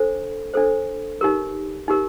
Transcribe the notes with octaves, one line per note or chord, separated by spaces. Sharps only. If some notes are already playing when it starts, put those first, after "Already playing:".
Already playing: D4 A4 C5
D4 A4 C5
D#4 G4 A#4
D#4 G4 A#4